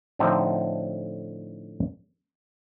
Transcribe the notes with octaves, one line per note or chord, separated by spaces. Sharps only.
A2 D3 F3 C4 D#4 A4